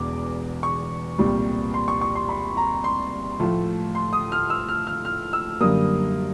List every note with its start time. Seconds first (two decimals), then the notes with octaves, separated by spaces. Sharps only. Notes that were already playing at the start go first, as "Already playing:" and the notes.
Already playing: E1 E2 D6
0.63 C#6
1.18 C2 A#2 G3
1.74 C6
1.88 C#6
2.01 C#6
2.15 C6
2.29 B5
2.57 A#5
2.84 C6
3.39 A2 F3 A3
3.95 C6
4.13 D#6
4.32 F6
4.50 E6
4.68 F6
4.87 F6
5.05 F6
5.33 E6
5.61 F#2 D3 G3 A#3 D#6